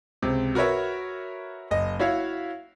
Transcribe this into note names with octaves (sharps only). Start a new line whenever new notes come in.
C#2 C3
F#4 A#4 B4 C#5 E5
F#1 D#5
E4 F#4 C#5 E5 F5